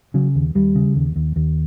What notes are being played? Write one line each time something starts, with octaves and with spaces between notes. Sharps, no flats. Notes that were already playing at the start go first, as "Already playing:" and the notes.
C#3 F#3
D#2
D#2 G3
C#3
D#2
D#2
D#2